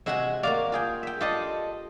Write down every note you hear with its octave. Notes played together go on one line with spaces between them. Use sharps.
C3 G#3 F#4 E5 F#5 G#5
A#3 F#4 D5 F5 D6
F4 G#4 G5
E5 G5
F4 G4 A4 D5 D#5 C6